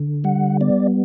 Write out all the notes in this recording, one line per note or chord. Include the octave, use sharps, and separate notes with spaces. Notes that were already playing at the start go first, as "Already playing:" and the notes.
Already playing: D3
G3 F#5
B3 D5